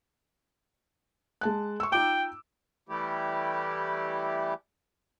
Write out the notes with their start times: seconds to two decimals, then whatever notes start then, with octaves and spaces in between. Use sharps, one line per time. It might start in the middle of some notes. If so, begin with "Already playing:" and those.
1.41 G#3 A5 F#6
1.80 C#6 E6
1.92 D#4 F4 G5 D6
2.89 E3 G3 A3 E4 G4